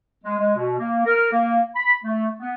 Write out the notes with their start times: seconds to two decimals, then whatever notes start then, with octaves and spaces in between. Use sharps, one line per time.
0.24 G#3
0.38 G#3
0.56 B2
0.78 A#3
1.06 A#4
1.32 A#3
1.76 B5
2.04 A3
2.40 B3